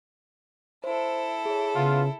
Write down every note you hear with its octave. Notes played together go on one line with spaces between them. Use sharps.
E4 A4 C5
G#4 C#5
C#3 B3 F4